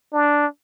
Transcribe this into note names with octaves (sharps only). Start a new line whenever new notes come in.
D4